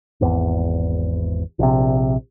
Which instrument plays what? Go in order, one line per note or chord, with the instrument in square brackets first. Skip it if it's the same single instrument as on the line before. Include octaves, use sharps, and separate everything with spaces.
[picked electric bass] G#1 E2
A#1 C3